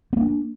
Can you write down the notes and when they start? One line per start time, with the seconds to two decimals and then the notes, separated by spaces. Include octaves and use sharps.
0.13 B3
0.17 A#3
0.21 D4